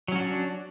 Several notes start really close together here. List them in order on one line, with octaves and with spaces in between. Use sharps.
F#3 C#4 F#4 D4